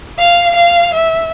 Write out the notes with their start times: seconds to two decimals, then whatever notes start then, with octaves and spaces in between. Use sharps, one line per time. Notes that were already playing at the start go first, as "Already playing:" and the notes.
0.18 F5
0.55 F5
0.94 E5